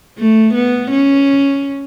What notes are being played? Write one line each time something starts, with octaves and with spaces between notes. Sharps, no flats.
A3
B3
C#4